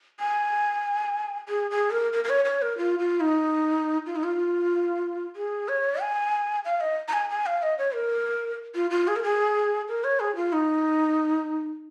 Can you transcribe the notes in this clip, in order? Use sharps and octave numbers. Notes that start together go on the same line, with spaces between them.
G#5
G#4
G#4
A#4
A#4
A#4
C#5
C#5
A#4
F4
F4
D#4
F4
D#4
F4
G#4
C#5
G#5
F5
D#5
A#5
G#5
G#5
F5
D#5
C#5
A#4
F4
F4
G#4
A#4
G#4
A#4
C#5
G#4
F4
D#4